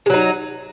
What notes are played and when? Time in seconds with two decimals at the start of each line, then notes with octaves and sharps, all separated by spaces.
0.06 G#3
0.10 F#3
0.14 D#4